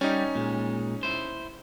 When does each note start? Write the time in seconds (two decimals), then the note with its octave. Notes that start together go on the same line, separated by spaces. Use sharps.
0.01 G3 C#4 D#4
0.35 A#2 G#3
1.03 E4 C5